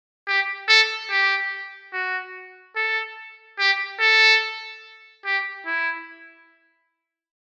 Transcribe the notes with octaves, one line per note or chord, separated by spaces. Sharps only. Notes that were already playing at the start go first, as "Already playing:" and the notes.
G4
A4
G4
F#4
A4
G4
A4
G4
E4